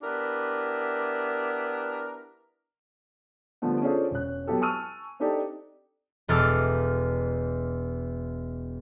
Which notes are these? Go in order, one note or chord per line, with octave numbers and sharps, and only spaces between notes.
B3 D4 E4 G4 A#4
D3 F3 G3 A3 B3
C#4 D4 F4 G#4 A4 C5
E1 C#4 F#6
F#3 B3 E4 G4 A4
G#5 A5 C#6 E6 F6 D#7
C4 D4 D#4 G4 A4 D5
E1 E2 A4 D6 F6